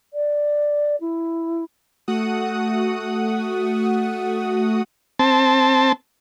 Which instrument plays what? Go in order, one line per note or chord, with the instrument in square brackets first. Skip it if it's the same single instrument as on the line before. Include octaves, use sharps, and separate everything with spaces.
[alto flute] D5
E4
[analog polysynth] A3 F#4 F#5 D#6
[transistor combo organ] C4 A5